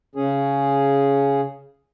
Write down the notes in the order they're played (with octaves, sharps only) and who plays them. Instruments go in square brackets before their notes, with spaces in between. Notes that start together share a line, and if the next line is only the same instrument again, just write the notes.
[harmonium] C#3 C#4 G#4